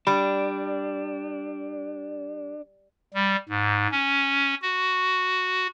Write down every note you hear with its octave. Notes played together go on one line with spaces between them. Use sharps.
G3 D4 B5
G3
G#2
C#4
F#4